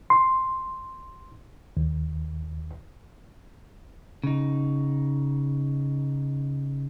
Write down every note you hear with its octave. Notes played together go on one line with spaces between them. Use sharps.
C6
D#2
C#3 D#4